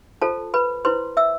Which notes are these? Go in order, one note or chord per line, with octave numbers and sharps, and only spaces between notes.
F4 A4 C5 A5
B4 B5
E4 B4 C5 C6
E5 E6